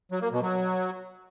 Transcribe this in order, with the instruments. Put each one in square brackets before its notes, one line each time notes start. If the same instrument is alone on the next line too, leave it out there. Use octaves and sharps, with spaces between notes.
[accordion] F#3
A#3
B2
F#3